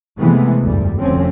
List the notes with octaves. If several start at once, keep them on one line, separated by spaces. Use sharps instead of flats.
C3 E3 G#3 A3 B3
F1 D2 G2 G3
F1 D2 D3 F3 C4 C#4